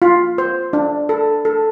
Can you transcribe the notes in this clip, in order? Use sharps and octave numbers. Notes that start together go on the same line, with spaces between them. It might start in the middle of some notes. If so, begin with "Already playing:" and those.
F4
C5
D4
A4
A4